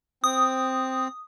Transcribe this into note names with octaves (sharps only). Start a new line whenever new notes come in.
C4 D#6